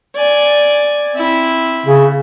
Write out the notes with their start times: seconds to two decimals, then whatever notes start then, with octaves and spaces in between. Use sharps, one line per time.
0.17 D5 G#5
1.14 C4 E4
1.86 C#3